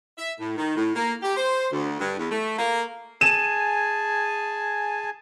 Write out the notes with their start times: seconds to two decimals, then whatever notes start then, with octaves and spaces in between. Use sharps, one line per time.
0.18 E5
0.40 A2
0.58 D#3
0.76 A2
0.96 A#3
1.22 G4
1.37 C5
1.73 D2
2.00 G2
2.19 E2
2.32 A3
2.59 A#3
3.21 G#4 G#5 A5 D#7 E7